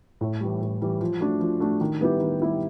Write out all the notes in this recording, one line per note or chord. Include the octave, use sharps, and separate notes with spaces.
A2
E3 G3
A2
E3 G3
F3
A3 D4 F#4
F3
A3 D4 F#4
D#3
G3 B3 E4 G4
D#3
G3 B3 E4 G4